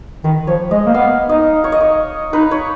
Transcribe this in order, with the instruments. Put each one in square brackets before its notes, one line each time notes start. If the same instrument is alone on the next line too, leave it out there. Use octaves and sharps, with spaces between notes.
[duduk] D#3 [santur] B4
[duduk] F3 [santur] C#5
[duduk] G#3 [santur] D#5
[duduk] A#3
[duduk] B3 [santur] F5
[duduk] D#4 [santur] D#5
[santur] C#5
D#5
C#5
[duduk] D#4 [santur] B4
[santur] C#5